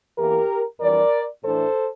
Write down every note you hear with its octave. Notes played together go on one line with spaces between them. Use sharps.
E2 E3 A#3 G4 A#4
F2 E3 G3 D4 A#4 D5
A2 E3 A3 D4 A4 C5